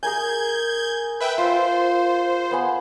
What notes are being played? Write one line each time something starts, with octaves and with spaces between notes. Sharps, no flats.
G#4 A#4 G#5 G6 G#6
B4 E5 G5
F4 C5
B3 F#5 G#5